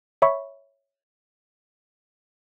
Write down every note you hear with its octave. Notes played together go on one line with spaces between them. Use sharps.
C#5 E5 B5 C#6